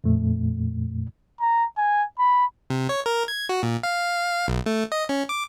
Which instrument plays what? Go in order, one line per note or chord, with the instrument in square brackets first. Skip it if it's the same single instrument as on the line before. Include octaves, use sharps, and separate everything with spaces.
[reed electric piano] F2 A#2 A3
[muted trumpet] A#5
G#5
B5
[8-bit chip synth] C3
C#5
A#4
G#6
F#4
A#2
F5
B1
A3
D#5
C#4
D6